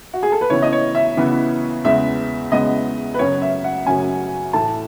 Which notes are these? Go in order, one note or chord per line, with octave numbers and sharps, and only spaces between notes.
F#4
G#4
A4
B4
C#3 E3 B3 C#5
D#5
C#5
E5
C#3 E3 B3
E2 C#3 G#3 B3 E5
E2 C#3 G#3 B3 D#5
B4
F#2 C#3 F#3 C#4 C#5
E5
F#5
F#2 C#3 F#3 C#4 G#5
A2 E3 A3 A5